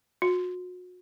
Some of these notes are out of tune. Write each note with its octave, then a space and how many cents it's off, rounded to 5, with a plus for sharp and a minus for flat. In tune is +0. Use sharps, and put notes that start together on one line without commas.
F#4 -35